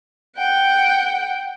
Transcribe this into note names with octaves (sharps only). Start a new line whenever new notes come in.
F#5 G5